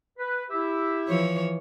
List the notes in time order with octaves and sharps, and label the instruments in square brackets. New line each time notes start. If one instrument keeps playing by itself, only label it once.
[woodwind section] B4
E4 G4 E5
[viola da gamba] E3 F3 C#5